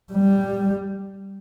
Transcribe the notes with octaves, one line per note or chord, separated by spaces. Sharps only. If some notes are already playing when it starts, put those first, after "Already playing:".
G3